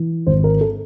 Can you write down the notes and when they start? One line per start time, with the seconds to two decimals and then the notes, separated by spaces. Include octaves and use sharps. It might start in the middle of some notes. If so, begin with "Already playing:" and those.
Already playing: E3
0.27 G#1 C5
0.44 A#4
0.61 A4